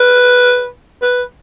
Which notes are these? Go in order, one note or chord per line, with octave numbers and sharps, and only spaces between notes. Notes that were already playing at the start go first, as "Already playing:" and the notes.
Already playing: B4
B4